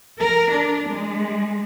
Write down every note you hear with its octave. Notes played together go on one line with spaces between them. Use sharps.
A#4
D4
G#3